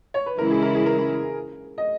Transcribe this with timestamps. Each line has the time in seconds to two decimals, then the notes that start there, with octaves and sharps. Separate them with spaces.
0.14 C#5
0.26 B4
0.38 C#3 E3 G#3 C#4 E4 A#4
0.51 G#4
0.62 A#4
0.75 G#4
0.86 A#4
1.78 D#5